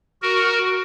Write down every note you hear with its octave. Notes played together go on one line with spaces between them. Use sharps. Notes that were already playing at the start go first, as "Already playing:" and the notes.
F#4 A#4